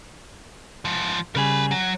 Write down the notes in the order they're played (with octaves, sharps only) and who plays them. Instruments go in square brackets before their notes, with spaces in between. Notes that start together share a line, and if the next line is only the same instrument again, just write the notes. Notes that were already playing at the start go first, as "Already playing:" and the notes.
[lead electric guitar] G#2 F3
[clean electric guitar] C#3 G3 G#4 [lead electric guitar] A#4 B5
[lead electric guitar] F#3